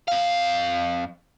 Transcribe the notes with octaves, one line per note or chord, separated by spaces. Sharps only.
F2 F5